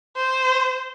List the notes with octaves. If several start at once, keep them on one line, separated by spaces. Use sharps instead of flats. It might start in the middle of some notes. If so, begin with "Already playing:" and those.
C5